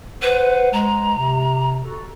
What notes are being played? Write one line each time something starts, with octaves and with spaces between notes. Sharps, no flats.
B4 C5 F#5
G#3 A#5
C3
F#4 A4